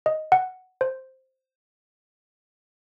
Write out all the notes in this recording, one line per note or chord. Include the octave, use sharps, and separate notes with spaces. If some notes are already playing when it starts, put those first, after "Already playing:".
D#5
F#5
C5